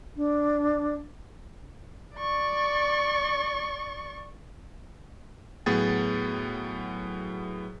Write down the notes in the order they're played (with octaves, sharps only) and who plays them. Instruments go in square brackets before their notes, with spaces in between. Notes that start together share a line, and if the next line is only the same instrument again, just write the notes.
[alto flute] D4
[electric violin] D5 C#6
[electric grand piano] A2 F#3 B3 G#4 G5 A6